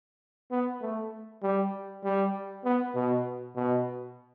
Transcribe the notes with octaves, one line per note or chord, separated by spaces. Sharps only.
B3
A3
G3
G3
B3
B2
B2